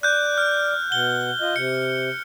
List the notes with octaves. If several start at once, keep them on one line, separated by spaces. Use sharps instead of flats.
D5 F#6 G6
F6
B2 F#5 G7
F4 D#5
C3 C#7